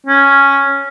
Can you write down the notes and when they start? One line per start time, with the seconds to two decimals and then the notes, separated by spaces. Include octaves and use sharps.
0.07 C#4